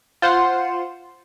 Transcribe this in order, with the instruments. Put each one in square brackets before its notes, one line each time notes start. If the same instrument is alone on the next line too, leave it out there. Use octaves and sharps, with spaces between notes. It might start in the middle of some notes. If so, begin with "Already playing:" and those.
[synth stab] F4 C5 F#5 C6